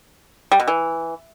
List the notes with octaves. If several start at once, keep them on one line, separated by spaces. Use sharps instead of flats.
G3
B2
E3